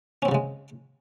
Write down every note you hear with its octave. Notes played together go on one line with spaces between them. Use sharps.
C#3 F#3 G#3 C4 C#4